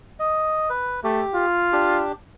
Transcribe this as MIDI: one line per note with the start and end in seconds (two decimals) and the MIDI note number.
0.19 0.69 75
0.70 1.00 71
1.04 1.24 57
1.04 1.46 67
1.34 2.04 65
1.73 2.12 62
1.73 2.12 67